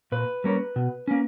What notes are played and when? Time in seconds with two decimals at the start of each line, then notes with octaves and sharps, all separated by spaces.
0.12 A#2 B4
0.44 G3 A#3 C#4
0.76 B2
1.08 A#3 C#4